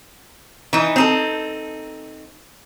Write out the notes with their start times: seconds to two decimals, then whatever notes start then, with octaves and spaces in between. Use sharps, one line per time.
0.73 E3 D#4
0.96 C4 D#4 A4